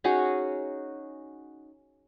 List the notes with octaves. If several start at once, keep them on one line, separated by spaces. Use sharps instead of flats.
C#4 D#4 F#4 G#4